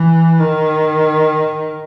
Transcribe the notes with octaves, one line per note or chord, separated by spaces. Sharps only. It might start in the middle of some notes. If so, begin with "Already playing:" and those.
Already playing: E3
D#3